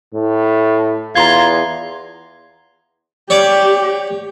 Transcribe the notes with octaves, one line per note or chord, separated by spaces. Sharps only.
A2
E2 F4 A#5 C6 G#6
G4 C#5 D5 D6